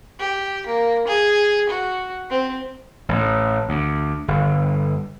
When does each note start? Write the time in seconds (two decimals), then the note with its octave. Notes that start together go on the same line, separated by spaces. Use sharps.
0.19 G4
0.66 A#3
1.08 G#4
1.69 F#4
2.30 C4
3.09 A1
3.69 D2
4.28 G1